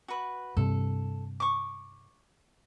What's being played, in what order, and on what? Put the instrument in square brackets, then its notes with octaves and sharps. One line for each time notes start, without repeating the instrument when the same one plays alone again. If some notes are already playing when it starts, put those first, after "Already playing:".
[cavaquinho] F#4 B4
[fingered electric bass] G2 C3 [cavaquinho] A4
[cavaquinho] C#6 D6